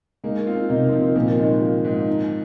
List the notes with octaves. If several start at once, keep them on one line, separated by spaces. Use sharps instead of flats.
G#3 A#3 D#4
C4 F4
C3 A#3 D#4
C4
F3 A#3
A#2 F3 A#3
D#3 G#3
F4
G#2
D#4